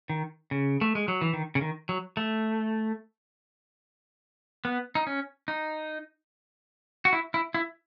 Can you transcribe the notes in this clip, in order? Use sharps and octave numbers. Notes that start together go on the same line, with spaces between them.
D#3
C#3
A3
G#3
F#3
E3
D#3
C#3
D#3
F#3
A3
B3
D#4
C#4
D#4
F#4
E4
E4
E4